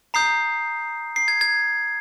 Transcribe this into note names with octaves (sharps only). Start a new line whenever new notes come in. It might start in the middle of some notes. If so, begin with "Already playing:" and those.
A#5 D#6 G6 C7
C7
G#6
G#6